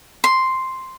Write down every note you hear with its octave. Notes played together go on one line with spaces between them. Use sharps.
C6